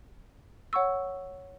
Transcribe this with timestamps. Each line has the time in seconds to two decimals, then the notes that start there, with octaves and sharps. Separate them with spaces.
0.73 C#5 F#5 C#6 E6